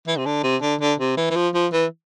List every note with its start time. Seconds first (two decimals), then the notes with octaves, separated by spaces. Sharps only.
0.07 E3
0.18 C3
0.26 D3
0.43 C3
0.62 D3
0.81 D3
1.00 C3
1.17 E3
1.30 E3
1.36 F3
1.54 F3
1.73 E3